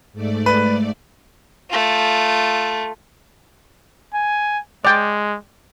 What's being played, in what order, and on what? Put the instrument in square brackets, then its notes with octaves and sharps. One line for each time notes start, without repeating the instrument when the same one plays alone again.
[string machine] G#2 A3 D5
[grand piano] B4
[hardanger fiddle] A3 F4
[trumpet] G#5
[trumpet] G#3 [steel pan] D5 G5